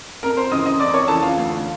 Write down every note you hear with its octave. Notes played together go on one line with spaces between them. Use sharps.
F2 A#4 A#5
C5 C6
C#3 E3 D#5 D#6
D#5 D#6
F2 D5 D6
C#5 C#6
C#3 E3 A4 A5
F4 F5
D2